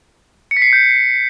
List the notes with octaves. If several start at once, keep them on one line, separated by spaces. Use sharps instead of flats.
C#7
B6
C7
C#7
G6